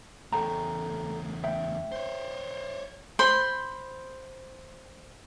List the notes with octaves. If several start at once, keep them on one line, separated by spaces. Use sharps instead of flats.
E2 A3 A4 G5 A#5
E5 G5
C5 C#5
C5 B5 C6